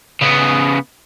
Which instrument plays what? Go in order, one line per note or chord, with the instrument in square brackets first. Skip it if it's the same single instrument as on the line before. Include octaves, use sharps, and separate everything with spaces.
[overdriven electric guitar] C#3 B3